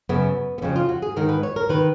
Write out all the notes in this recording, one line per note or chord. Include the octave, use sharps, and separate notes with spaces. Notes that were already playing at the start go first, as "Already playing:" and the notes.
F#2 C#3 B3
B3
F2 C#3 C#4
F4
F#4
G#4
G#2 D#3 A#4
B4
C#5
A#4
D#3 B4